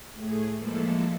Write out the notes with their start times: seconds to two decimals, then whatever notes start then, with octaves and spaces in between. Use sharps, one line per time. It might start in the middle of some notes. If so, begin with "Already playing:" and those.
0.14 A2 A3 G#4
0.57 E3 F3 G#3 A#3 E4 A4